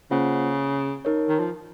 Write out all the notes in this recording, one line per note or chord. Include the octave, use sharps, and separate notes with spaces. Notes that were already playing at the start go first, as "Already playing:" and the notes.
C#3 A#3 F4 C5 F#5
D#4 A#4 C#5
D#3
F3